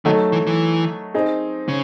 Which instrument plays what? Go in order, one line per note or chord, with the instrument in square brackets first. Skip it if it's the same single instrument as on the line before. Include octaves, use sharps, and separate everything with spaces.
[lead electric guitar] D#3 [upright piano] F#3 A3 D#4 A4
[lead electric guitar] E3
E3
[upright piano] C4 D#4 G#4
[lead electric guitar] C#3